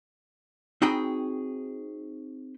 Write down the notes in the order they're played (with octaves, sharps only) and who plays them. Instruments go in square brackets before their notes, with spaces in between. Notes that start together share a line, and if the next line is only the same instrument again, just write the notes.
[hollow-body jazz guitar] C4 D#4 F#4 G#4 G5 B5